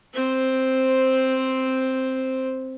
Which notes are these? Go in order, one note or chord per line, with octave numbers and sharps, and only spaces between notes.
C4 C5